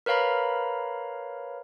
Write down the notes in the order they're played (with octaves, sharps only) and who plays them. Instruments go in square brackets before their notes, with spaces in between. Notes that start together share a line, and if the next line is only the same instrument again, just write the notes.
[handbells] A#4 B4 C#5 F5 A#5 B5